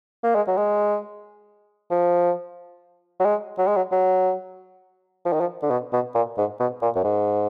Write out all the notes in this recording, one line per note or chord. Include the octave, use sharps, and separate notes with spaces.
A#3
G#3
F#3
G#3
F3
F#3
G#3
F#3
G#3
F#3
F#3
F3
D#3
F3
D3
B2
B2
A#2
G#2
B2
A#2
F#2
G#2